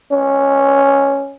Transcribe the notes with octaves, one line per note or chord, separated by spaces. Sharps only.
C#4